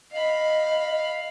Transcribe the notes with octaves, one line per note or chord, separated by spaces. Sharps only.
D#5 F5 B5